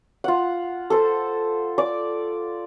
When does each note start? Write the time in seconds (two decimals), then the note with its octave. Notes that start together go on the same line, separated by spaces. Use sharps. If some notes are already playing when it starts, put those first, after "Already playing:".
0.24 F4 F#5
0.90 A4 C5
1.78 D5 D6